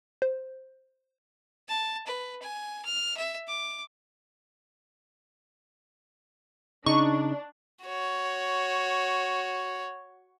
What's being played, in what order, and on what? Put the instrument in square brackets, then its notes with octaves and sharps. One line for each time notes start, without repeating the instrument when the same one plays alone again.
[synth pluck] C5
[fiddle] A5
B4
G#5
F6
E5
D6
[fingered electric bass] C#3 [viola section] D4 [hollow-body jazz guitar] D#4 [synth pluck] C#6
[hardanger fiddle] F#4 C#5